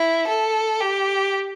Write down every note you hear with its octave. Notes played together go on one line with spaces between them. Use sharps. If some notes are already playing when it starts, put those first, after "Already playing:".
Already playing: E4
A4
G4